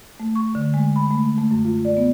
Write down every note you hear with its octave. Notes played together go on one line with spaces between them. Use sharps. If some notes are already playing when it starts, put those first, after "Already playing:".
A3
C#6
D3
G#3
B5
A3
A3
F#2
F4
D5
B3